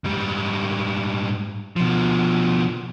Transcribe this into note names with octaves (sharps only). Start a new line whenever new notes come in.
G#2 G3
B2 F3